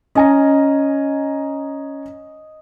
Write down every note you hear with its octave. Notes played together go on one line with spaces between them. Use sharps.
C#4 D#5 G#5 A#5